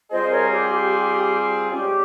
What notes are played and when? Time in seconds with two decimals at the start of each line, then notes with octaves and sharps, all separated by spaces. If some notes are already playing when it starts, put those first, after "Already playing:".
0.11 G3 C4 F4 G#4 C5 D#5
0.31 A#4 C#5
0.52 G4
0.70 G4
1.70 G#2 G3 C#4 G4